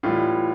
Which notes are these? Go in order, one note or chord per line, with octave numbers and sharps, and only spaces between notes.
A2 E3 G3 F4